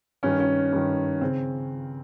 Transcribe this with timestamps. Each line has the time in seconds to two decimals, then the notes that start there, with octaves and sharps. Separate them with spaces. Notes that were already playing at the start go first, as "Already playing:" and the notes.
0.23 G2 D#3 C#4
0.40 C#4
0.72 G2 D#3
1.21 C#3 C4